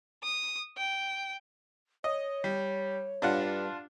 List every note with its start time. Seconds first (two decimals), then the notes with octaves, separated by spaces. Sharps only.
0.23 D#6
0.77 G5
2.04 C#5 D#5
2.44 G3
3.22 G2 D4 F4 F#5